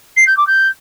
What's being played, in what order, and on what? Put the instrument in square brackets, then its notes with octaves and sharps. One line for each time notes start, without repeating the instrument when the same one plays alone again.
[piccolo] C7
G6
D6
G6